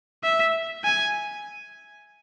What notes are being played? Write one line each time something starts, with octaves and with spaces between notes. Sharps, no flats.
E5
G#5